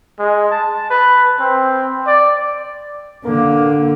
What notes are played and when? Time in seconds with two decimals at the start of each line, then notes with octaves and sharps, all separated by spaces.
0.19 G#3
0.51 A5
0.90 B4
1.40 C4
2.07 D5
3.25 D3 A#3